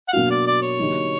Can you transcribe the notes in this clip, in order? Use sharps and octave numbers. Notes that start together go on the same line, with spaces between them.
F#5
B2 F#3 A#3 D4 F#4 F5
D5
D5
C#5
D3 F#3 A#3 D#4 G4